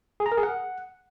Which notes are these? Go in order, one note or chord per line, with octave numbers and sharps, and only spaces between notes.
G#4
A#5
A#4
G#4
F#5